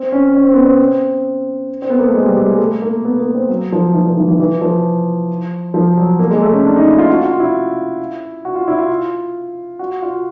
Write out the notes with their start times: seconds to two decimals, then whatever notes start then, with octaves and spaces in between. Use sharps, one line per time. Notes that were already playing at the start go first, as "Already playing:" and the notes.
Already playing: C4
0.12 C#4
0.34 C#4
0.44 C4
0.54 B3
0.64 C4
1.82 C4
1.90 B3
1.99 A#3
2.06 A3
2.15 G#3
2.25 G3
2.36 G3
2.48 G#3
2.60 A3
2.82 A#3
3.05 B3
3.20 A#3
3.34 C4
3.49 F#3
3.72 F3
3.94 E3
4.06 F3
4.17 E3
4.28 E3
4.40 E3
4.61 F3
5.74 F3
5.97 F#3
6.19 A#3
6.31 G#3
6.42 A3
6.53 C#4
6.65 D4
6.76 D#4
6.87 E4
6.98 F4
7.10 F#4
7.25 F4
7.40 E4
8.45 F#4
8.55 F4
8.68 E4
8.78 F4
9.79 F#4
10.02 F4